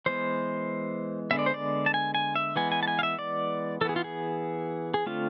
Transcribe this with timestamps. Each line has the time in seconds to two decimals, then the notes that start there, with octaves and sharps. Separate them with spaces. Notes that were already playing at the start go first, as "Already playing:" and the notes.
0.06 E3 G#3 B3 C5
1.31 D3 G#3 B3 E5
1.39 D5
1.46 C5
1.54 D5
1.86 A5
1.94 G#5
2.15 G#5
2.36 E5
2.56 E3 G#3 B3 G#5
2.72 G#5
2.83 A5
2.88 G#5
2.99 F5
3.03 E5
3.19 D5
3.81 E3 A4
3.85 B3 G#4
3.96 F4
4.04 G#4
4.94 G#4
5.06 D3 A3 C4 F4